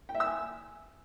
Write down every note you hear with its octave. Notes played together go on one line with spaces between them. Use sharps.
G5
E5
E6
G#5